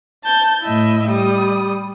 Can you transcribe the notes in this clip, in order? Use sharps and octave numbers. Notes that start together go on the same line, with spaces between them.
A5 G6
A2 E4 D#5 E5
G3 D#6